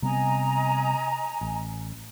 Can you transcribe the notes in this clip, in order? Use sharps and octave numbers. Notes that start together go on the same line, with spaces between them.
C3 G3 B3 D#5 G#5 A#5
A1